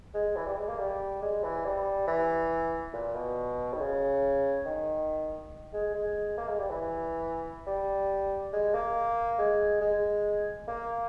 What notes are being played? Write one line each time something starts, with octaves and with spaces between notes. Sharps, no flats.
G#3
E3
G3
G#3
A#3
G3
G#3
E3
G3
E3
A#2
B2
D#3
C#3
D#3
G#3
G#3
A#3
G#3
G3
E3
G3
G#3
A#3
G#3
G#3
A#3